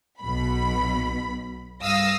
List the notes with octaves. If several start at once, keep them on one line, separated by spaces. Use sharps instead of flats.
B1 B2 B5
G2 F5 D#6 E6 A#6